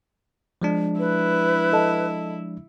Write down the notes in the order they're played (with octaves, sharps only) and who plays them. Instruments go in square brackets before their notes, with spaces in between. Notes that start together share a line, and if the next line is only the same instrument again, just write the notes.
[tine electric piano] F3 G#3 D4
[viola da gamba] E4 [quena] B4
[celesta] A4 D#5 A5